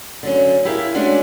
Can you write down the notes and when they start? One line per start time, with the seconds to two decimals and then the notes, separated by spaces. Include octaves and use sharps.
0.23 D3 F#3 C#4
0.65 E4 G4 G#4 A#4 E5 F5
0.95 G#3 A3 C#4 D4 F#4